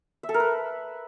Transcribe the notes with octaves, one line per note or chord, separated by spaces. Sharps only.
E5
A4
A#4
B4